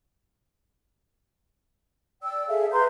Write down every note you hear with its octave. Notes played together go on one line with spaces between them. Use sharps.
D5 G5 E6
G#4 A4 E5 F5
B4 A#5 C6 G6